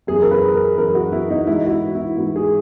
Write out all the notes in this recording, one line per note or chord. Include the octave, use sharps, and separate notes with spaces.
F#2 E3 G#4
A#4
B4
A#4
F#2 E3 A#4
F#4
E4
D#4
G#2 E3 E4
F#4
E4
E4
G#2 E3 F#4
G#4